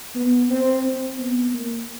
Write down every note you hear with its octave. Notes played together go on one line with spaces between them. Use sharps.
B3
C4
C4
B3
A#3